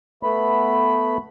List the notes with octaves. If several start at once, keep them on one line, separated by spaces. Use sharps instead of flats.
A3 B3 B5